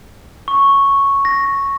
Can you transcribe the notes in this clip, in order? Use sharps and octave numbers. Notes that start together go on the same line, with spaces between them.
C#6
A#6